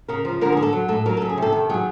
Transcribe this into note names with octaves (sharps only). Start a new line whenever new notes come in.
C#3 A#4
F3
D3 A#4
G#4
D3
A4
F#3
A2 A4
F#3 A#4
C#3 A4
G#4
C3 A4
D#3
F#3 G#4